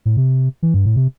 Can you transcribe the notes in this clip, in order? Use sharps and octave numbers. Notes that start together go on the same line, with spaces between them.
A2
C3
E3
G2
A2
C3